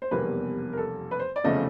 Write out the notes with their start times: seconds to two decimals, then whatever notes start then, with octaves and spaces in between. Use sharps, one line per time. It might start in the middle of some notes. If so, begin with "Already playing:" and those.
0.02 C5
0.11 F1 E2 B2 G3 A#3 B4
0.73 A#4
0.78 A4
1.11 B4
1.20 C5
1.36 D5
1.44 F1 E2 C#3 F3 A3 D#5